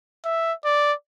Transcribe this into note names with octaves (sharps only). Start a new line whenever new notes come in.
E5
D5